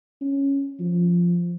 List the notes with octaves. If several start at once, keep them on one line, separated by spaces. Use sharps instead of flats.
C#4
F3